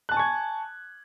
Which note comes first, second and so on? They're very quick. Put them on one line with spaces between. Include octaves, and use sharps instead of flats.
F#6 A5 G#5 C#6 G#6